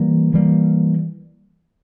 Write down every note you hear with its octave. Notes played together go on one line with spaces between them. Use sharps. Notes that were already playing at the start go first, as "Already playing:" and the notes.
Already playing: E3 G3 A#3
E3 G3 A#3